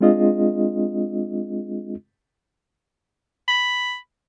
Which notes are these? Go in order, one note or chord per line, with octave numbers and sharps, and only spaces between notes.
G#3 C4 D4 F4 G#4 D#5
B5